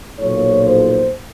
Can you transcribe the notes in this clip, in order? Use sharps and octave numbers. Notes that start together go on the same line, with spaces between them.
B1 A#2 F3 C#5
C5